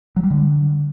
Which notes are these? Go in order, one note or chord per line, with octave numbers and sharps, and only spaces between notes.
F#3
G3
D3